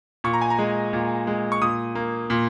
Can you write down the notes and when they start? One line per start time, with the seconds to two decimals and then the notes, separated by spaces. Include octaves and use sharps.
0.24 A#2 C#6
0.33 A#5
0.41 G#5
0.50 A#5
0.59 G#3
0.93 A#2
1.27 G#3
1.52 C#6
1.61 A#2 D#6
1.95 A#3
2.30 A#2